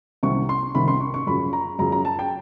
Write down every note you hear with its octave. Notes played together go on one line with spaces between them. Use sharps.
C2 C3 D#3 C#6
C6
C2 C3 D#3 B5
C6
C#6
C#6
F#2 C#3 F3 B5
A#5
F#2 C#3 F3 A#5
A#5
A5
G5